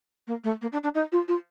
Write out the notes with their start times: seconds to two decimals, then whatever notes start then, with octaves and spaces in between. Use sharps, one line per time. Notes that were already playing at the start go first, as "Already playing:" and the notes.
0.27 A#3
0.44 A3
0.62 A#3
0.72 D4
0.83 D4
0.95 D#4
1.12 F4
1.28 F4